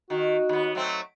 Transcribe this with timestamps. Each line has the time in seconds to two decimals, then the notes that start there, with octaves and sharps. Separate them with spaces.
0.10 D#3 F#4
0.49 D#2 B3
0.75 F#3 A3 C4